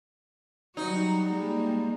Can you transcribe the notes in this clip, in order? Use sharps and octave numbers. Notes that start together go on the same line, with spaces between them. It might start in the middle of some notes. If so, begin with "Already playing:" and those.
F#3 G3 D#4 F#4
G3 G#3 A#3